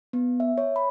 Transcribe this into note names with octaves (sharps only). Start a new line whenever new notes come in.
B3
E5
C#5
B5